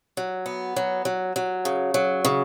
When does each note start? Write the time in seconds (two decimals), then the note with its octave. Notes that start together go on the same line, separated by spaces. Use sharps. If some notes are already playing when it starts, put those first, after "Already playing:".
0.17 F#3
0.46 B3
0.76 F#3
1.05 F#3
1.36 F#3
1.65 C#3
1.94 F#3
2.25 C#3